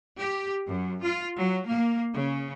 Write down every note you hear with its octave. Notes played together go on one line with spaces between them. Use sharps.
G4
F#2
F4
F#3
A#3
C#3